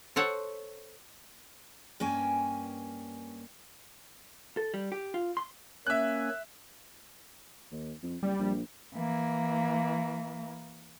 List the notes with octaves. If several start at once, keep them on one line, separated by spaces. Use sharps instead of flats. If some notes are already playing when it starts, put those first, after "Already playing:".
A4 C5 C#5 F#5
G2 A#3 C#4 G5 G#5
A4
G3
G4
F4
C6
A#3 C#4 E5 G#5 F#6
D#2
F2
F#1 G3
A#1
E3 A#3